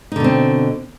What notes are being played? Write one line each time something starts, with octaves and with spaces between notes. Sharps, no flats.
B2 D3 C4 D#4